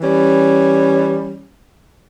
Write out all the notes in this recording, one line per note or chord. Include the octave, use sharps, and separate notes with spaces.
E3 G3 C#4